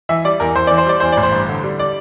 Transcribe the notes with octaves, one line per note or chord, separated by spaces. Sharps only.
E3 E5
G3 D5
E2 A#4
E2 C5
E3 D5
C5
G3 D5
E2 C5
A1 D5
C5
G2
D3
G3
D5